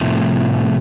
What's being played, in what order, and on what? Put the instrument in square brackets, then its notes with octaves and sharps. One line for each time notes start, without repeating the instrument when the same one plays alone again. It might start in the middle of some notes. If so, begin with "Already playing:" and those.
[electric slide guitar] A2 C3 F3